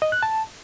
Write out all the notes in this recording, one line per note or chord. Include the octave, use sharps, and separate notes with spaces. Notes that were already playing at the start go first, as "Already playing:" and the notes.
D#5
F#6
A5